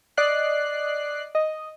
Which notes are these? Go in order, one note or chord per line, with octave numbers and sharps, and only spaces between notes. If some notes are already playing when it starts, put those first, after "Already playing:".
D5 D#5 F#6 C7
D#5